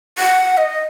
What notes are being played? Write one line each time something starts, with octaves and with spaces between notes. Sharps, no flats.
F#5
D#5